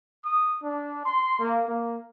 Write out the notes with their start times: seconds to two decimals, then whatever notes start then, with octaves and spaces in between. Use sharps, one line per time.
0.25 D#6
0.63 D4
1.06 C6
1.40 A#3
1.69 A#3